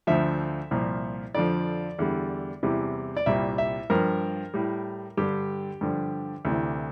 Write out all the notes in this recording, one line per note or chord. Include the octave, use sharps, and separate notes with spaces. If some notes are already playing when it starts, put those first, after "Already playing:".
D2 D3 F3 E5
C2 A#2 F3
F2 D3 F3 D5
E2 D3 G3
E2 C3 E3 G3
D5
C2 A#2 G3 E5
E5
G2 F3 A#4
A2 G3
G2 D3 G3 G4
G2 D3 F3
D2 C3 E3